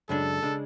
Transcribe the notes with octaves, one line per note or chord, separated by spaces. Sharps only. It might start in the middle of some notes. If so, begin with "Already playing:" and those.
F#2 C#3 G#3 D4 A4
C#3 G#3 D4